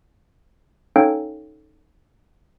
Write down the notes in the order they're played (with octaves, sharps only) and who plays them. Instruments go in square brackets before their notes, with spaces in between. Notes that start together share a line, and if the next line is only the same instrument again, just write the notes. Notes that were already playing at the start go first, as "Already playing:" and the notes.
[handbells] C#4 D#4 A4 C#5 F5 G5